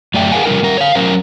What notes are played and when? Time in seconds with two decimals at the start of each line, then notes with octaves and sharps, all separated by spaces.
0.14 F#2 A3 D5 E5 G5
0.32 G#4 A#4 B4 F5 F#5 G#5
0.45 C#3 F3 G3 C#4 F4 A#4
0.63 G3 A#4
0.77 C#5 F5
0.95 F#3 C#4 A#4 C5